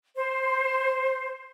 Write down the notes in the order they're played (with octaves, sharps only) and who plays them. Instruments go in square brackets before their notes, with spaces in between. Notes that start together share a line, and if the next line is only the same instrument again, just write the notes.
[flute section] C5